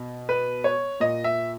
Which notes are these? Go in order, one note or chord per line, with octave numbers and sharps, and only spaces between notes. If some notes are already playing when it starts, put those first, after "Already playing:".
Already playing: B2
B4
C#5
A#2 D#5
E5